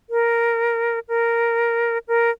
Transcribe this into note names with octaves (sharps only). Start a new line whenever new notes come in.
A#4
A#4
A#4